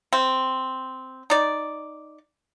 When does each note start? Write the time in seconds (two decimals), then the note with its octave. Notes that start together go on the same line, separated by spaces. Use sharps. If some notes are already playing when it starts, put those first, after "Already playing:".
0.13 C4
1.30 D#4 D5